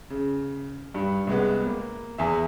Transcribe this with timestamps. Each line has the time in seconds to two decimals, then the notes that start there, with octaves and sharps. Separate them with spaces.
0.10 C#3
0.94 G2
1.27 C2 G#3 B3
1.66 A#3
2.18 E2 G#4 E5